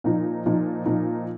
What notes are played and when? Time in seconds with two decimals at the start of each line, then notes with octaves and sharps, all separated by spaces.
0.04 A#2 F3 D#4
0.46 A#2 F3 D#4
0.86 A#2 F3 D#4